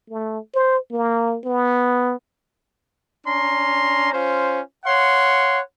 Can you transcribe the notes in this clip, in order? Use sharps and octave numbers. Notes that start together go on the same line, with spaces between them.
A3
C5
A#3
B3
C#4 D4 A#5 C6
C#4 F4 C5
C#5 F5 F#5 C6